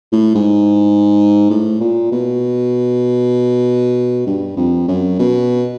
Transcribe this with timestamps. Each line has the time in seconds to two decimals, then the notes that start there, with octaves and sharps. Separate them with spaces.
0.12 A2
0.35 G#2
1.50 A2
1.80 A#2
2.12 B2
4.27 G2
4.57 F2
4.88 F#2
5.19 B2